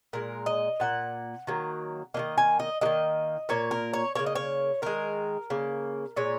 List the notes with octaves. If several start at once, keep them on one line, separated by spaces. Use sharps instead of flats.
A#2 G#3 A#4
D#5
A#2 A#3 F#5
D#3 F#3 A#3
D#3 F#3 A#3 D#5
G#5
D#5
D#3 F#3 A#3 D#5
A#2 A#3 C#5
A#4
C#5
C#3 A#3 C#5
D#5
C#5
D#3 G#3 A#4
C#3 A#3
A#2 G#3 C#5